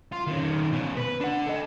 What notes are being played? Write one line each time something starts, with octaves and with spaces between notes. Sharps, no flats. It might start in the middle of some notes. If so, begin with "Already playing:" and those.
F4
D#3 C#4
B2 C#4
B4
D4 F#5
A4 D#5